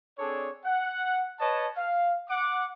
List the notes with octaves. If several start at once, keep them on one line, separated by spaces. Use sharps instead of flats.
C4 D4 G#4 A4 C#5 D5
F#5
B4 C#5 D#5 A5
F5
F#5 D6